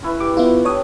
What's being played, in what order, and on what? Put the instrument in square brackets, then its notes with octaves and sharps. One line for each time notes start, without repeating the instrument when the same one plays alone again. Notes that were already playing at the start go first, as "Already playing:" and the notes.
[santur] C#4 E4 B4
[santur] G4 [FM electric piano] D6
[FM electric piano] B3 E4 F4
[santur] D4 G4 [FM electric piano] C#5 D#6